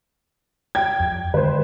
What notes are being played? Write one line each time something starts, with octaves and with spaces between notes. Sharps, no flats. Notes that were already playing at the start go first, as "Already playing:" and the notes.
G5 G#6
F2
D3 D#3 G#3 B4 C5